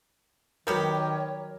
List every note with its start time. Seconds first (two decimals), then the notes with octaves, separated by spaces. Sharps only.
0.67 D#3 F#3 G3 B3 G4 A#4 C#5